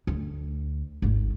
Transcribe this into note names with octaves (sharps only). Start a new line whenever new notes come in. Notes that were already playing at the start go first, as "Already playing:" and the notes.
D2
G#1 D#2